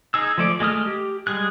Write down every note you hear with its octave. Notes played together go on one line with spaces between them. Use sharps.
D#4 G#4 E6
F3 A3 D5
G#3 A3 D#6 F6
G4
G3 G#3 G#4 F#6